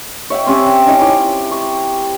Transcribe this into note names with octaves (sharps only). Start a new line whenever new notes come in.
C#5 E5 F#5 G5
C4 C#4 G4
C#4 D#4 A#5
E4 D6
C#6